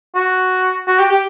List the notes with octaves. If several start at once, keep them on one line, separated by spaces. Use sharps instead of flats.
F#4
F#4
G4
G4